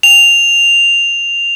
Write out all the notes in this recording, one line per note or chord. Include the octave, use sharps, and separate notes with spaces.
F7